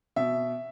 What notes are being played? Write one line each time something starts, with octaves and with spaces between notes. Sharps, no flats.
B2 E5